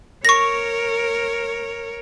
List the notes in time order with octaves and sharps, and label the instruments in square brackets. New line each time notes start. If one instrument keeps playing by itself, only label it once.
[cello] A#4 C#5 [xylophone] C#6 A#6